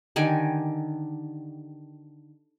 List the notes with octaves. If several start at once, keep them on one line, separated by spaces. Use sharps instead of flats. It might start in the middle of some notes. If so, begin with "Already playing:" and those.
D3 D#3 G4 G#5